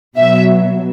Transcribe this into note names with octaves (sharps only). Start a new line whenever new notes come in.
B2 F#3 E5